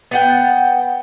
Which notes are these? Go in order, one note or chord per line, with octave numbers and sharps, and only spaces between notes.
B3 F#5 G5